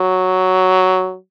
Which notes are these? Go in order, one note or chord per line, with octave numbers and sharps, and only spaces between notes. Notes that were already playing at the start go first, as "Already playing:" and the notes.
Already playing: F#3